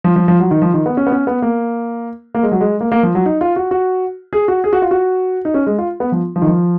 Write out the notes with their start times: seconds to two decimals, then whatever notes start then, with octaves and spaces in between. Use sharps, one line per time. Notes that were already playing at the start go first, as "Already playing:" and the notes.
0.04 F3
0.16 F3
0.28 F3
0.40 F#3
0.51 D#3
0.62 F3
0.74 D#3
0.86 B3
0.97 C#4
1.07 B3
1.12 C#4
1.27 B3
1.42 A#3
2.35 A#3
2.43 G#3
2.52 F#3
2.61 G#3
2.81 A#3
2.92 A#3
3.03 F3
3.15 F#3
3.26 D#4
3.41 F4
3.56 F#4
3.71 F#4
4.33 G#4
4.48 F#4
4.64 G#4
4.73 F#4
4.82 F4
4.91 F#4
5.45 D#4
5.54 C#4
5.66 G#3
5.78 F4
6.00 B3
6.12 F3
6.36 F3
6.42 D#3
6.47 F3